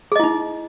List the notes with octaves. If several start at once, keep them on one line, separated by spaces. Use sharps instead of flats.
D#4 E4 G#4 D#5